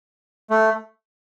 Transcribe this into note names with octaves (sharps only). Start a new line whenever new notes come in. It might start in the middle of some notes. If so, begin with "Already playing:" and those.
A3